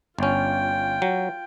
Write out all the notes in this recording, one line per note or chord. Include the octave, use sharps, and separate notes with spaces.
G1 C#4 F4 G5
F#3